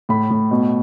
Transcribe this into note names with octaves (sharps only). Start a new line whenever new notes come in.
A2 B5
A2
B2